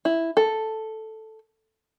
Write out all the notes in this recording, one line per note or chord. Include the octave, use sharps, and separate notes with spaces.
E4
A4